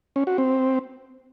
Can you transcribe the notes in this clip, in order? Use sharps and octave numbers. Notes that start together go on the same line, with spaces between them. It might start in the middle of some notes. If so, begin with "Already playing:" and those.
C#4
F#4
C4